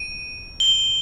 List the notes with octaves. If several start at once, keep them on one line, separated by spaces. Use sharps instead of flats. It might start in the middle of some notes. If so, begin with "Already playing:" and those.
Already playing: D#7
G7